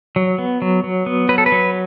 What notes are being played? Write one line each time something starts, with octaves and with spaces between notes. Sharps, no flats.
F#3
B3
F#3
F#3
B3
F#3 B4
A4
B4
F#3